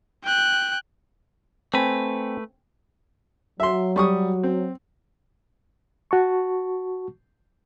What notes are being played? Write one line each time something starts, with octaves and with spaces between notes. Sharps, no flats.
G5 F#6
A3 C4 B4 G#5
F#3 E5 C6
G3 C#6 D#6
C4
F#4 A5 C#6